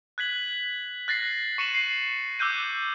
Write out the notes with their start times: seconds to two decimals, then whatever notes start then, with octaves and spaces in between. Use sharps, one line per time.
0.18 F#6 G#6 B6 F#7
1.08 F#6 A6 A#6 C7
1.58 C#6 C#7 D#7 E7 F#7
1.74 C7
2.39 D6 E6 F#6 G6 D#7